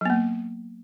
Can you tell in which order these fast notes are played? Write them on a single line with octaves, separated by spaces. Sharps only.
F#3 B3 A#3